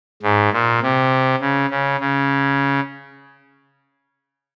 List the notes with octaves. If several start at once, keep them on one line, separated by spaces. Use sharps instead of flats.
G#2
A#2
C3
C#3
C#3
C#3